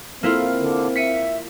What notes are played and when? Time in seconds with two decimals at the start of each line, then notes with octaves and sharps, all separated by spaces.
0.23 A#3 C4 E4 F4 A4
0.58 D3
0.96 E5 B6 C#7 D#7